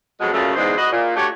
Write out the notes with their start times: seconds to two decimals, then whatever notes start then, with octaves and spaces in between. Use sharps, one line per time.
0.21 F2 B2 F#3 G#3
0.33 F#2 A#2 C#3 A3
0.56 E2 G#2 G#3 D4 C5
0.78 F#4 B4 D#5
0.92 A#2
1.15 A3 D4 F#4 G4 C#5